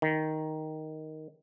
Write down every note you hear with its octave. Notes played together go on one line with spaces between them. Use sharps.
D#3